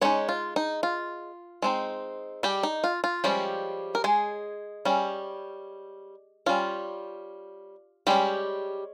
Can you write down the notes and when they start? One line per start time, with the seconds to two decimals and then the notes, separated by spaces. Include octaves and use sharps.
0.02 G#3 C#4 D#4 C#5
0.29 F4
0.56 D#4
0.83 F4
1.62 G#3 C4 D#4
2.43 G3 G4
2.63 D#4
2.84 F4
3.04 F4
3.24 F3 G3 G#3 C#4 G4
3.95 A#4
4.04 G#3 G#4
4.85 G3 C#4
6.46 G3 C#4 F4
8.07 G3 G#3 C#4 G4